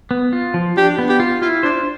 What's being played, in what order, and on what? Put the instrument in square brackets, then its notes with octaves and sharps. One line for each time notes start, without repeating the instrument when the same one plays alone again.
[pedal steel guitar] B3
F4
F3
[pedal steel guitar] D4 [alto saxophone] G4
[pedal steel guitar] B3
[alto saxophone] G4
[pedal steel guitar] F4
[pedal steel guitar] E4 [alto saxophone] F4
[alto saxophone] D4 [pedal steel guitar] C5